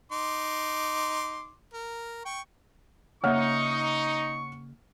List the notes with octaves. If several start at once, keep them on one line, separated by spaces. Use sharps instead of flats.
D#4 C6 D6
A#4
G5 C#6
C#3 A#3 D#4 C#5 E5 F#5 C#6 F6